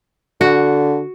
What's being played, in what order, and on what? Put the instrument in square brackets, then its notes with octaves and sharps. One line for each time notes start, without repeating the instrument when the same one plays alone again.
[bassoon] D3 [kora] F#4